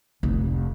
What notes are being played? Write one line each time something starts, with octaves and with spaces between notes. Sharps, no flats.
F1